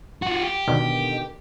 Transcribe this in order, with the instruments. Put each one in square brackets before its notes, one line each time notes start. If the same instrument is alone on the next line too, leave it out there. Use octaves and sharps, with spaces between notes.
[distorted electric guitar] F4 F#4
G4
[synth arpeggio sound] B2 D3 D#3